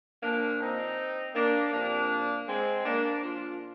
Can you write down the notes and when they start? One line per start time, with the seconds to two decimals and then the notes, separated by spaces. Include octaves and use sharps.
0.23 A#2 F3 A#3 D4
0.60 C4 D#4
1.35 A#3 D4
1.73 C3 F3 A#3 D4
2.48 G#3 C4
2.85 A#3 D4
3.23 A#2 F3 D4 F4